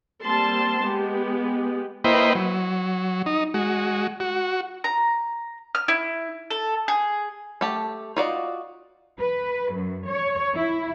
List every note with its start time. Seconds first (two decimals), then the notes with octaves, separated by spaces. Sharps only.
0.25 G3 A#3 C4 A5 C6
0.81 G#3 B3 G4
2.04 A#3 E4 B4 C5 D#5 G5
2.35 F#3
3.26 D#4
3.54 G#3 F#4
4.20 F#4
4.84 A#5
5.75 F6
5.88 E4
6.51 A4
6.88 G#4
7.61 A3 G4 A5
8.16 F4 F#4 D5 D#5
9.18 B4
9.72 F#2
10.06 C#5
10.55 E4